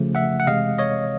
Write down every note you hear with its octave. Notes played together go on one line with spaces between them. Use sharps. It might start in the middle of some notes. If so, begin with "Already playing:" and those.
Already playing: C#3 F3 A3
E5 F#5
F#5
C3 E3 G#3 D#5 F5
C#5 D#5